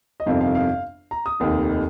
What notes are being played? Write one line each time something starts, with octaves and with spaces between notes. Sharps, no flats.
D#5
G1 F2 C3 D#3 F5
F5
F5
A#5
D#6
F1 D#2 D#3